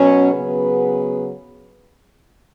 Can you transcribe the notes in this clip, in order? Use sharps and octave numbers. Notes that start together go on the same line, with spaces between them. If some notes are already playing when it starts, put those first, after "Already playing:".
Already playing: B2 F#3 C#4
C#3 F#3 B3 G#4 B4